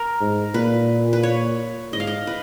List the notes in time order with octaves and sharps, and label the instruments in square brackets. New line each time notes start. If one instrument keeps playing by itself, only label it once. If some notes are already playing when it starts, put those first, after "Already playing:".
Already playing: [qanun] A#4
[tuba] G#2
[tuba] A#2 [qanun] B4
[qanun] B4
C#5
[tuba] G#2 [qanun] D#5
[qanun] F5
D#5
B4